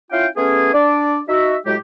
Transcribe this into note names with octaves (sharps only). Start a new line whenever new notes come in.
C#4 E4 F4 F5 G5
A3 B3 C#4 G#4
D4 D5
D#4 F#4 E5
A2 F#3 G#3 G4